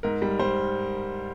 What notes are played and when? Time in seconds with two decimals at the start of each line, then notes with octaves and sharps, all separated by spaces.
0.03 G#2 A#4
0.22 G3
0.39 G3 C5